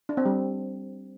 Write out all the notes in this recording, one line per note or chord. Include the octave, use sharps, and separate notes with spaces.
D4
C4
G3